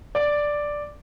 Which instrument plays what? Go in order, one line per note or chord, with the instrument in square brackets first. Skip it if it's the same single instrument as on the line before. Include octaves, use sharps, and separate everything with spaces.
[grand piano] D5